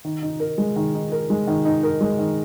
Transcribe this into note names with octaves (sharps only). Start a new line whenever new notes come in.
D#3
D#4
A#4
G#3
D#3
D#4
A#4
G#3
D#3
D#4
A#4
G#3
D#3